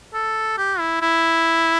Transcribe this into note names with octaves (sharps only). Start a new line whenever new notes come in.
A4
G4
E4
E4